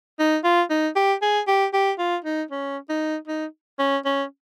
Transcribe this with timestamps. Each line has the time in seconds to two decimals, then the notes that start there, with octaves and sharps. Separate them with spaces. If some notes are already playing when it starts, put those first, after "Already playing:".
0.19 D#4
0.44 F4
0.70 D#4
0.96 G4
1.22 G#4
1.48 G4
1.73 G4
1.98 F4
2.25 D#4
2.51 C#4
2.89 D#4
3.28 D#4
3.79 C#4
4.05 C#4